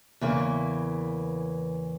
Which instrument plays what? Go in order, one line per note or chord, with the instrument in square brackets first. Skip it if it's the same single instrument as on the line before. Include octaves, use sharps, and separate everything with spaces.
[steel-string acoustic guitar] E2 C#3 E3 A#3